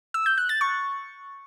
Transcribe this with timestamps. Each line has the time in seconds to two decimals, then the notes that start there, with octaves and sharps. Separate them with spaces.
0.14 E6
0.26 G6
0.38 F#6
0.49 A6
0.61 C#6